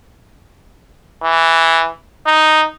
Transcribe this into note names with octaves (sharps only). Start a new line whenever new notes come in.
E3
D#4